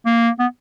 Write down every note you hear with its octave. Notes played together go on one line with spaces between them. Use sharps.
A#3
B3